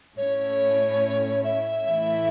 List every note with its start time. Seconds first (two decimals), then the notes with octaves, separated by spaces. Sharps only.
0.17 A2 A3 C#4 E4 C#5
1.44 E5
1.86 A2 E3 A3 E4